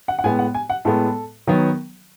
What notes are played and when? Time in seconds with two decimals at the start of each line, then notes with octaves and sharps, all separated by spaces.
0.08 F#5
0.19 F#5
0.24 A2 G#3 B3 G#5
0.39 F#5
0.54 G#5
0.70 F#5
0.85 A2 G#3 B3 A4
1.47 D#3 F#3 B3